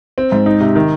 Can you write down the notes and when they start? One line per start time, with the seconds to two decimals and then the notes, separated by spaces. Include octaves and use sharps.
0.18 C4
0.32 G#2
0.46 D#4
0.61 C3
0.75 D#3